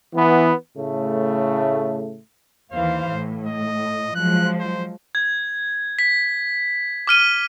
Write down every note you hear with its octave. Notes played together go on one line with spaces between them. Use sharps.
E3 B3
A2 C#3 A3
D#2 E3 C5 F5
A2
D#5
F3 F#3 G#3 F#6
C5
G#6
B6
D6 F6 D#7 G7